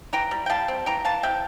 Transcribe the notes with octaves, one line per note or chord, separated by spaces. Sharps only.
E3 G5 A#5
G3
G5
G3 F5 A5
C4
E3 G5 A#5
E3 F5 A5
C3 E5 G5